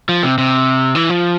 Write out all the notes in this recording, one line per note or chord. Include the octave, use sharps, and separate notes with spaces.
F3
C3
C3
E3
F3